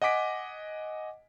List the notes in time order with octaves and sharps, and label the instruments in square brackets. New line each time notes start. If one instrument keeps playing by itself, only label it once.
[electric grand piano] D#5 F#5 G#5 D6 B6 D7